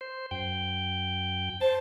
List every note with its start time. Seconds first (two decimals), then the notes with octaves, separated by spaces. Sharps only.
0.01 C5
0.31 F#2 G5
1.61 C5 A5